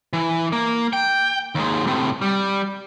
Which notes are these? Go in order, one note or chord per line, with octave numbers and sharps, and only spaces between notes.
E3
A#3
G5
D#2 G#3
A2 C3
G3